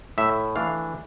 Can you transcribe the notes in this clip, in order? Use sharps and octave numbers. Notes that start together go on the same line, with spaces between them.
A2 E5
E3 A3 D4 F5